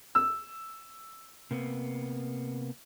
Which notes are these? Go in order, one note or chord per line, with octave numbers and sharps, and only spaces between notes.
E6
C3 A#3 B3